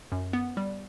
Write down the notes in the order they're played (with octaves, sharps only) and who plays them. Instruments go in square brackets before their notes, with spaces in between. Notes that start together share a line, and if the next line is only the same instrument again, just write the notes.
[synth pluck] F#2
B3
G3